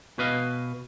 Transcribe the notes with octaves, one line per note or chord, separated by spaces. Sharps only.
B2 B4 D#5 F5